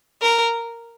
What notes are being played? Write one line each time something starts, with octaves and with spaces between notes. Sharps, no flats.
A#4